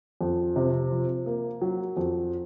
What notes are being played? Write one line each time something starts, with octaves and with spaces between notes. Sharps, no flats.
F2
C3
F3
A#3
F#3
F2